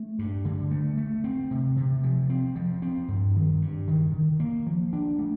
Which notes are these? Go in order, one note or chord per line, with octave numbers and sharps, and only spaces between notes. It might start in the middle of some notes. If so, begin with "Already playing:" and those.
Already playing: A3
G2
D3
A3
A3
C4
C3
C3
F3
C4
F3
C4
G2
D#3
G2
D#3
D#3
A#3
F3
D4
A3